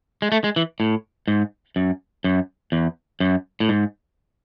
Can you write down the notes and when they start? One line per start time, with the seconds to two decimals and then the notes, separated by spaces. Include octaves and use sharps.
0.22 G#3
0.32 A3
0.44 G#3
0.56 E3
0.80 A2
1.28 G#2
1.76 F#2
2.24 F#2
2.72 E2
3.20 F#2
3.60 A2
3.69 G#2